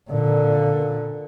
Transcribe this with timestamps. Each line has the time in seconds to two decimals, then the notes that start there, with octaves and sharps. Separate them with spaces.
0.11 A#2 D3